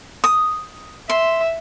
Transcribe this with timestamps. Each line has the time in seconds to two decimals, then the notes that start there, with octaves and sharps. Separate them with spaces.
0.24 D#6
1.10 E5 C6